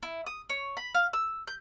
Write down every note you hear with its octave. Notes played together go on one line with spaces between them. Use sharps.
E4
D#6
C#5
B5
F5
E6
G6